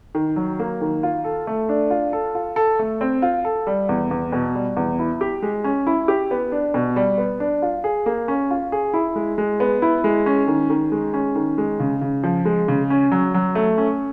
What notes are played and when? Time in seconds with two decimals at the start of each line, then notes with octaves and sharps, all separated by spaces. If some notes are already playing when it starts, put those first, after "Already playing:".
0.15 D#3
0.36 F#3
0.59 A#3
0.81 D#3
1.03 F4
1.24 A4
1.47 A3
1.69 D4
1.91 F4
2.13 A4
2.35 F4
2.56 A4
2.79 A3
3.01 C4
3.22 F4
3.45 A4
3.67 G3
3.89 E2
4.11 E2
4.32 B2
4.55 G3
4.77 E2
4.99 E4
5.21 G4
5.42 G#3
5.64 C#4
5.87 E4
6.08 G4
6.31 B3
6.52 D4
6.74 B2
6.96 G3
7.18 B3
7.40 D4
7.62 F4
7.84 G#4
8.06 A#3
8.28 C#4
8.51 F4
8.72 G#4
8.94 E4
9.16 G#3
9.38 G#3
9.60 B3
9.82 E4
10.04 G#3
10.26 C#4
10.48 D#3
10.70 D#3
10.92 G#3
11.14 C#4
11.35 D#3
11.58 G#3
11.80 C#3
12.01 C#3
12.24 F3
12.45 G#3
12.68 C#3
12.90 C#4
13.12 F#3
13.34 F#3
13.55 A3
13.78 C#4